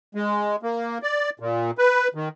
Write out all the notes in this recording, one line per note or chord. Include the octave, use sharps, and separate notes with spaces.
G#3
A#3
D5
A#2
B4
D#3